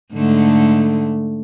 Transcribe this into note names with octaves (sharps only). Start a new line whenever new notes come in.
G#2 D3 A3